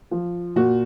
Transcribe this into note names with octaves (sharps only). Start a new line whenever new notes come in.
F3
A#2 F#4